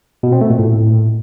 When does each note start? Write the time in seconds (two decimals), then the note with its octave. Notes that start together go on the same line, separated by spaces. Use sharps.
0.23 B2
0.32 C4
0.41 A3
0.50 A#2
0.59 A2